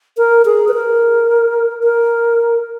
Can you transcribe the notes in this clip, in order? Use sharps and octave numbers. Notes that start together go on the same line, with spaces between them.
A#4
G#4
B4
A#4
A#4